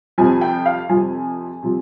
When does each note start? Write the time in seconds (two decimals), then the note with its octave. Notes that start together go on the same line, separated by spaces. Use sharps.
0.18 F2 C3 F3 G#5
0.41 G5
0.66 F5
0.89 F2 C3 F3 G#5
1.63 C3 F3